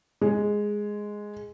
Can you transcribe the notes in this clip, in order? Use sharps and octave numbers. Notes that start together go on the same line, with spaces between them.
G#3